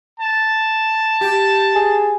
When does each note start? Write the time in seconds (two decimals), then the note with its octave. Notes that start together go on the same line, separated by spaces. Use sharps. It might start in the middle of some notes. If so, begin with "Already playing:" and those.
0.20 A5
1.21 G4
1.75 G#4